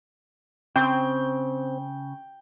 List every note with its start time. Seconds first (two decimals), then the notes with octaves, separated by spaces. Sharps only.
0.76 C#3 C4 G5